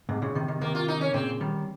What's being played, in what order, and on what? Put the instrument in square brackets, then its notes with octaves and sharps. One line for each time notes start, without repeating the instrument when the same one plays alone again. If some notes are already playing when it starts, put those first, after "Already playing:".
[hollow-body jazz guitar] G#2 C3
A#2 C#3
C3 D#3
C3 D#3
[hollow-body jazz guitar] C3 D#3 [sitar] A#3
[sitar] F4
D#4
C#4
[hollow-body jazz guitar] A#2 C#3 [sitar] C4
[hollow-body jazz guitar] D#3 G3